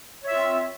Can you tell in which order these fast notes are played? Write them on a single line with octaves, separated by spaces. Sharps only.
C#5 E5 F4 C4